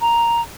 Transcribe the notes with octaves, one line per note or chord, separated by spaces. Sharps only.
A#5